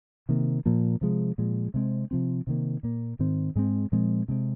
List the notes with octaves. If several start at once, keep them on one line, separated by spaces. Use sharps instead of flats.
C3 D#3 A#3
A#2 F3 A#3
C3 F3 G#3
A#2 F3 G#3
C3 G#3 C4
C3 F3 C4
C3 D#3 A#3
A#2 A#3
G#2 D#3 C4
G#2 G#3 C4
A#2 F3 G#3 C4
C3 G#3 C4